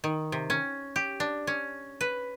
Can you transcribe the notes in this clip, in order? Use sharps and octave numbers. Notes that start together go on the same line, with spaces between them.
D#3
C3
C#4
G4
D4
C#4
B4